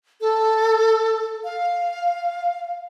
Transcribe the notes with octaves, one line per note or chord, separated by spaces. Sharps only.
A4
F5